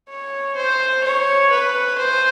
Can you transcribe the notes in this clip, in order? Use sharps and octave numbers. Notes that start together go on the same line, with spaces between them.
C#5
C5
C#5
B4
C5